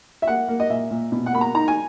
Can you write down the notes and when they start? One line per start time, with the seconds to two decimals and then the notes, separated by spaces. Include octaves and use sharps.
0.22 E5
0.27 A#3 F#5
0.48 A#3
0.60 D#5
0.70 A#2 E5
0.91 A#2
1.12 B2
1.26 F#5
1.33 A#3 B5
1.41 A#5
1.55 D#4 A#5
1.68 G#5